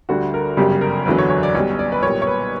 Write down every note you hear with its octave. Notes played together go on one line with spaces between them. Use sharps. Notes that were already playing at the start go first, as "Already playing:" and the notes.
D2 D3 G3 F#4
A#4
G1 F#2 C#3 G3 G4
A#4
F#1 E2 D3 F#3 B4
C#5
C#5
D5
B1 B2 G3 C#5
D5
B4
B1 A#2 G3 C#5
C#5
B4